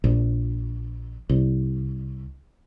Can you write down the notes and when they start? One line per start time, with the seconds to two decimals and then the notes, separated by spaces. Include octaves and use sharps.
0.04 A#1
1.29 C2